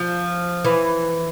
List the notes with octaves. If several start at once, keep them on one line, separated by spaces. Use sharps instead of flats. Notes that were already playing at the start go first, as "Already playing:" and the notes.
Already playing: F3
E3